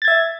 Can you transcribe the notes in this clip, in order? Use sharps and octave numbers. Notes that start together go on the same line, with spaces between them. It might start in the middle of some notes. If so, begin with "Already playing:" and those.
E5 G#6 A6